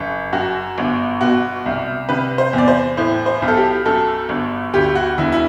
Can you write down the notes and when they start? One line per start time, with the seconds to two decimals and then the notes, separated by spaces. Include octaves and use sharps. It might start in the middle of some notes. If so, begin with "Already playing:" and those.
Already playing: F#1
0.33 F#2 F#4
0.78 G1
1.21 B2 F#4
1.66 C2
2.09 C3 B4
2.38 C5
2.53 E2
2.58 D5
2.68 C5
2.97 A2 C5
3.26 C5
3.42 B1
3.48 A4
3.57 G4
3.85 F#2 A4
4.29 G1
4.74 D2 G4
4.95 F#4
5.18 E1 E4
5.32 E4